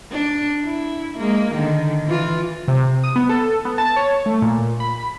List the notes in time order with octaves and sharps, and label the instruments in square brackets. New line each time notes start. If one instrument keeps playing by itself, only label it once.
[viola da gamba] D4
E4
G#3 A#3
D3 D#3
E3 F4
[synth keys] C3
D#6
B3
A4
B3
A5
C#5
A3
A#2
B5